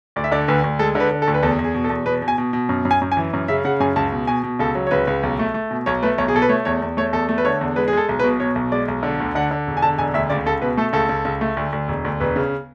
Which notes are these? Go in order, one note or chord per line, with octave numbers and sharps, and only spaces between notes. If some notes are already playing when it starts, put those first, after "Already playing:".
D2 D5
E5
D3 D5
D2 B4
D2
G#3 A4
D3 B4
D3
A4
D2
B4
E2 A4
E2
G#4
B2
A4
E2
B2 B4
B2
G#5
B2
B2
F#2
F#2
G#5
F#2
G#5
E3
F#2
C#3 E5
C#3 F#5
F#2 G#5
C#2 A5
B2
B2 G#5
B2
C#2 A4
F#3
C#5
C#2 B4
C#2
B1
A3
A3
B2
B1 C#5
A3 B4
B1 C#5
G#4
B2 A4
B4
A3 C#5
E2 C#5
E2
A3 C#5
E2 A4
A3
B4
D3 C#5
E2
G#3 B4
G#4
G#3 A4
B1
B4
B2
B2 C#5
B1
G#3 D5
B1
D3
D2
D3 F#5
D3
E1
G#5
D3 A5
E1 G#5
D2 E5
C#2 D5
C#2 A4
B2 B4
A3 A4
C#2 A4
C#2
C#2
A3
D2
D2
E1
D2
E1 B4
C#3